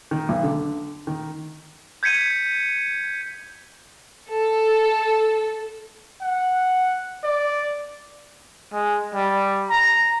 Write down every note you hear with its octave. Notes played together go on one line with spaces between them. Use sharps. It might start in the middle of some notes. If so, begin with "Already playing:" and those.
D#3
B1
D3
D#3
G6 G#6 B6 C#7 D#7
A4
F#5
D5
G#3
G3
A#5